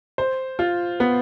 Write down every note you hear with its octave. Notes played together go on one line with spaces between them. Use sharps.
C5
F4
B3